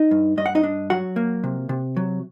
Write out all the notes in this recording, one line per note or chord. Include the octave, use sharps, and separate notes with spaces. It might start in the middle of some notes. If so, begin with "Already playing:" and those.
Already playing: D#4 D#5
G2
G2 D#5
F#5
D#4 D#5
D4
F#3 F#4 F#5
A#3
C3
C3
F#3